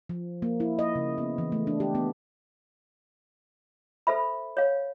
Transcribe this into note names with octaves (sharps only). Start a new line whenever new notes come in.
F3
A#3
E4
D#5
C#3
B3
E3
A3
D4
G4
B3
A4 C5 E5 B5
C#5 F5